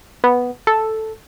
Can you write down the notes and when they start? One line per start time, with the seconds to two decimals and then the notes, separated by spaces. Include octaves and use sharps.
0.24 B3
0.67 A4